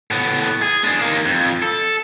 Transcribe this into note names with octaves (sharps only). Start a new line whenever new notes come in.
A2 B3
G#4
G#3 D4
A#3 D#4
F2
A4